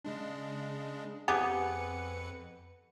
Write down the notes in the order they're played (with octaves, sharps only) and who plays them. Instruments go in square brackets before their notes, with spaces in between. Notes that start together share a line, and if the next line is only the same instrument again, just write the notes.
[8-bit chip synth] C#3 G#3 D4
[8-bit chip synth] F2 B4 C#7 [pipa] B3 G4 G#4